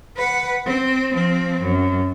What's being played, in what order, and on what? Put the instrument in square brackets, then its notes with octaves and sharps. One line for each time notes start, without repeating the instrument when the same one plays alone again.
[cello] B4 F#5
C4
F3 C4
F#2